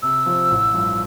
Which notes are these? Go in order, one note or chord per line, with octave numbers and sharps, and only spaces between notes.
C3 E6
F3 C4
A1
G2 F3